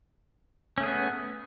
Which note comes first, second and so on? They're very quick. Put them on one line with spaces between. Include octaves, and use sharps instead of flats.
C#4 A3 G#4 B3